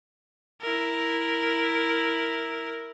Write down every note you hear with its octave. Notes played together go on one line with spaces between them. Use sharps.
E4 A#4